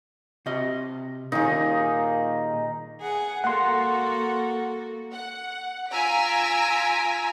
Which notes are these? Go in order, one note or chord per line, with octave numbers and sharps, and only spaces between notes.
C3 D#5
A#2 D#3 A#3 D#4 G#4
G#4 F#5
A#3 F#4 A4 F#5 C6
F#5
F4 G#5 A#5 E6 B6 D7